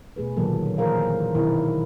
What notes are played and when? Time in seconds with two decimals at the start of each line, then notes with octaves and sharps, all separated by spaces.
0.16 B2 A3 G#4 B4
0.37 A#2 D3 D#3 F#3 A#3 A4
0.78 E3 G#4 A#4 C5 F5
1.35 B2 D#3 E4 A#4